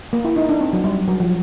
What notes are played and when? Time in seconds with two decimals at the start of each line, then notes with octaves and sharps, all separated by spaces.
0.13 A#3
0.25 E4
0.36 D#4
0.49 D4
0.61 C4
0.73 F#3
0.84 G3
1.08 F#3
1.20 F3